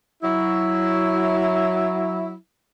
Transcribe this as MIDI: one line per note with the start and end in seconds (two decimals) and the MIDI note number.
0.23 2.34 54
0.23 2.34 64